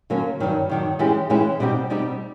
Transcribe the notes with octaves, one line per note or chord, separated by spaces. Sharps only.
D3 F#3 A#3 C#4
G2 D#3 F#3
G2 D#3 F#3
E3 G#3 C#4 E4 G4
E3 G#3 C#4 E4 G4
B2 G3 C4 D#4 G4
B2 G3 C4 D#4 G4